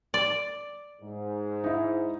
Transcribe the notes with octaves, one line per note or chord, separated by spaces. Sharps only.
D5
G#2
D#4 E4